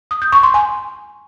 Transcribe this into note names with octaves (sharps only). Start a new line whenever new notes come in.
D#6
G6
C#6
C6
G#5